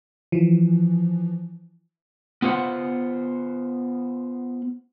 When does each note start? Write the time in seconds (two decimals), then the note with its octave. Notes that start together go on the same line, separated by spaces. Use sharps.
0.32 E3 F3
2.42 B3 F4 C5 F#5